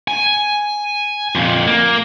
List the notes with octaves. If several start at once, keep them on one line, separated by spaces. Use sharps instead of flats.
G#5
F2 A#2
A#3